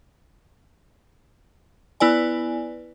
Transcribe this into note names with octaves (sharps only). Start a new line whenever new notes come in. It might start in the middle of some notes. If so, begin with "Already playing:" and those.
B3 E4 B4 D5 G#5